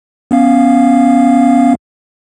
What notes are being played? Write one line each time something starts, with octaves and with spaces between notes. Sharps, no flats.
B3 C#4 F5